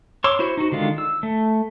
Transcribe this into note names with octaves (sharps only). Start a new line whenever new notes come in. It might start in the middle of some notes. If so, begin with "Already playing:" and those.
C#5 C6 D6 E6
E4 F#4 C5
D#4 F#4
D3 D#3 G#3 F4
E6
A3